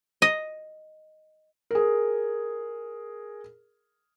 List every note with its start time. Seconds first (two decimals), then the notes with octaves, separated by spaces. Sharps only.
0.22 D#5
1.71 G#4 A#4